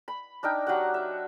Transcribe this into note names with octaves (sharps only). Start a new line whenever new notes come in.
B5
D4 D#4 A#4 G5
F#3 G4 F#5
E5